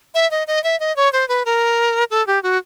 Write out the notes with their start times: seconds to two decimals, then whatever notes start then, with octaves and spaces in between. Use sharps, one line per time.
0.14 E5
0.31 D#5
0.47 D#5
0.64 E5
0.80 D#5
0.96 C#5
1.13 C5
1.28 B4
1.45 A#4
2.10 A4
2.27 G4
2.43 F#4